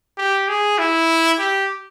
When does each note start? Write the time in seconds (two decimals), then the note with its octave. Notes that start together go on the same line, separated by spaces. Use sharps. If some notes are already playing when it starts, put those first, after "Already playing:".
0.18 G4
0.48 G#4
0.78 E4
1.39 G4